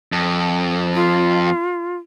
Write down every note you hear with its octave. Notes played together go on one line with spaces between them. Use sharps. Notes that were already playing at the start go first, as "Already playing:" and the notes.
F2
F4